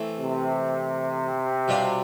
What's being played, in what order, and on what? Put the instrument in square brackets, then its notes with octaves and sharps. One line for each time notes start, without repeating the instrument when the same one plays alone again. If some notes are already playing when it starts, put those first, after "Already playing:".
Already playing: [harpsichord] E3 A3 C4
[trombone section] C3
[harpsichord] B2 G3 D4 F4